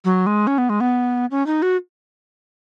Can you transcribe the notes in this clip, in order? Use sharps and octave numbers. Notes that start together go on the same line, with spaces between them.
F#3
G#3
C#4
B3
G#3
B3
C#4
D#4
F#4